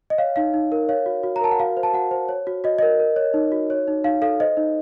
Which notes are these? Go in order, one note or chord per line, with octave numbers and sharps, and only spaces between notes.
D#5
C#5 F5
D#4 F5
D#4
A#4
C#5 F5
F#4
F#4
A#5
A#4 A5
F#5
F#4 F5
C5
A5
F#4 F#5
C5
C#5
F#4
F#4 D#5
A#4 D#5
A#4
C#5
D#4
F#4
C#5
D#4
D#4 F5
A4 F5
C5 D#5
D#4